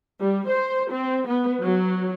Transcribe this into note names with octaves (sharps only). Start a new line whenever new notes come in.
G3
C5
C4
B3
F#3